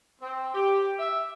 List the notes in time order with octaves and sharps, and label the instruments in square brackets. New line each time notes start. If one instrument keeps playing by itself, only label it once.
[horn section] C4
G4
E5